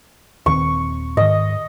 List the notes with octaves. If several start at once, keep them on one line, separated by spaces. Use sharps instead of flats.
D#1 D#3 C4 C#6
G#2 D#3 D#5